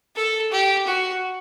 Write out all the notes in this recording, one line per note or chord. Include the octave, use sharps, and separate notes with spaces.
A4
G4
F#4